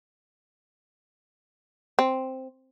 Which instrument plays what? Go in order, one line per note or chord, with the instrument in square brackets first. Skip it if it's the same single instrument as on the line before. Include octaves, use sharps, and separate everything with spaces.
[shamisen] C4